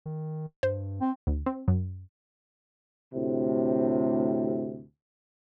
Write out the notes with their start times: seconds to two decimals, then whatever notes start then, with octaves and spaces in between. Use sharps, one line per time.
0.06 D#3
0.63 G2 C5
1.01 C4
1.27 D2
1.46 C4
1.68 F#2
3.14 D2 A2 C3